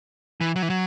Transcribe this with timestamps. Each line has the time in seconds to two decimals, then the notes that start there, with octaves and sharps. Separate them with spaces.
0.41 E3
0.56 F#3
0.62 E3
0.70 F#3